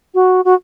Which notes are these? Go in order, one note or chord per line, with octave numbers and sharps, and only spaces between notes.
F#4
F#4